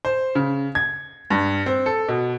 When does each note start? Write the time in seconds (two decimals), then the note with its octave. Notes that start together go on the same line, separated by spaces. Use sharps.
0.05 C5
0.35 C#3
0.75 G#6
1.30 G2
1.66 C4
1.86 A4
2.08 B2